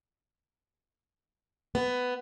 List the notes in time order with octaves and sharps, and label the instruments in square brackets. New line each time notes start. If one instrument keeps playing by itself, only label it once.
[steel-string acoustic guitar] B3